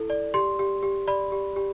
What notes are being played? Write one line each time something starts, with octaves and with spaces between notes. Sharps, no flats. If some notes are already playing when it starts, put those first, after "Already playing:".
Already playing: E4 A4
D5
G4 C6
G4
G4
D5 B5
G4
G4